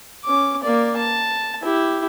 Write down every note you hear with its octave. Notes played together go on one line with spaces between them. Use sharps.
C#4 D6
A#3 D5
A5
E4 G4